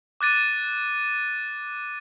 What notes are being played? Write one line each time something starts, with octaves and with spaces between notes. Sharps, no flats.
D6 F#6 A6 D#7